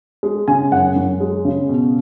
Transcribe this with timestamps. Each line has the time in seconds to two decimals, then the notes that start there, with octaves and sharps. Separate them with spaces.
0.23 G#3
0.48 C#3 G#5
0.72 F#2 F#5
0.96 F#2
1.20 G#3
1.45 C#3
1.69 B2